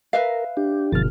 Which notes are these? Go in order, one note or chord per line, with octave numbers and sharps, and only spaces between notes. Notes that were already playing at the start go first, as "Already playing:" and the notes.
A#4 B4 E5 F5
D4 G4
G1 B2 F3 F6 A6